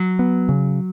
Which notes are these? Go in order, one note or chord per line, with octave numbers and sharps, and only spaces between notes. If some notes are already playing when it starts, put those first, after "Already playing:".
Already playing: F#3
B3
C#3